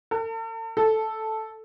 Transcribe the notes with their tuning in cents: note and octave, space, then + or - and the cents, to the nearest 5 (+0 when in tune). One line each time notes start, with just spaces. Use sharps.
A4 +40
A4 -5